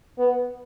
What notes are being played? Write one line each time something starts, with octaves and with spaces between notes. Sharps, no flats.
B3